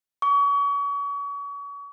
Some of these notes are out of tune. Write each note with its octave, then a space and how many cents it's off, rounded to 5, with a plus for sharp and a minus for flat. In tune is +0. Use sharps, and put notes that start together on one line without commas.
C#6 +35